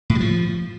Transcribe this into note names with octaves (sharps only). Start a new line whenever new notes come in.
A2
G3
F3